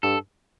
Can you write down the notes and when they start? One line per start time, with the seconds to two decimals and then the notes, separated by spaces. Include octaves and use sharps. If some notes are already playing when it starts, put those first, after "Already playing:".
0.03 G2 A4